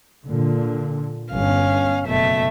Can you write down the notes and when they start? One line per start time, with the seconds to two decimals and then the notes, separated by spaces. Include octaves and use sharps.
0.25 A#2 D3
1.32 G1 C#4 F5
2.06 F#1 B2 A3 E5